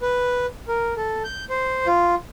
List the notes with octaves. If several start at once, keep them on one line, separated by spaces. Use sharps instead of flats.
B4
A#4
A4
G6
C5
F4